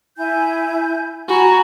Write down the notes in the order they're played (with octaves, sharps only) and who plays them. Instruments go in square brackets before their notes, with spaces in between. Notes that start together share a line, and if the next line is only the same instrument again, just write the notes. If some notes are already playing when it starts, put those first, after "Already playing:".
[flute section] E4 G#5 G6
[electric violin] F#4 [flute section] G#5 A#5 B5